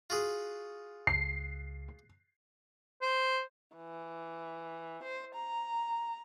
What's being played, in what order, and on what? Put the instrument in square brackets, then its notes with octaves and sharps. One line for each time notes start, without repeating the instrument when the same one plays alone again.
[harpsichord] F4 F#4 G#4
[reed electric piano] C#2 [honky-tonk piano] C7
[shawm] C5
[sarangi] E3
C5
A#5